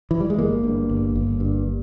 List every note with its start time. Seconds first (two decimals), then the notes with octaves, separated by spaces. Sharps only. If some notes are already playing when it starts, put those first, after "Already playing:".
0.11 E3
0.20 G3
0.30 G#3
0.39 G1 A#3
0.64 G2
0.89 G1
1.15 G1
1.40 G2